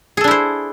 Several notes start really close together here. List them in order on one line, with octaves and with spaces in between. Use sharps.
G#4 A4 D4 E4 C5